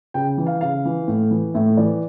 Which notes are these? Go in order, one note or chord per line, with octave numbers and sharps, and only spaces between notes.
C#3 G5
E3
F5
C#3 F5
E3
A2
E3
A2 E5
E3 D5